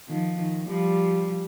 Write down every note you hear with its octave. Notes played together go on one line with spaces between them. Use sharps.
D#3 F3
D#3
F3 G3